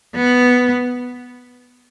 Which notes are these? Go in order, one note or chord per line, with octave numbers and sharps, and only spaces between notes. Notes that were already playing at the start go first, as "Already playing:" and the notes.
B3